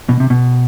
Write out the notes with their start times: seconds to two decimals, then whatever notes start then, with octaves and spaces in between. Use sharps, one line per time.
0.09 B2
0.20 C3
0.30 B2